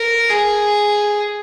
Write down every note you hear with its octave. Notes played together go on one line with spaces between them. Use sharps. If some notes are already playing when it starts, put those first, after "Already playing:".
Already playing: A#4
G#4